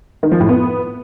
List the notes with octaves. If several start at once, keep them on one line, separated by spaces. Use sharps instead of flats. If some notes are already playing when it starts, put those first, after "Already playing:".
D#3
F3
A2
B3